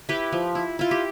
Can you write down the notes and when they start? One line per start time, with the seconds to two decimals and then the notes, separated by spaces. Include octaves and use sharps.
0.09 E4 G4 B4
0.32 F3
0.55 E4
0.79 E4 F4
0.91 G4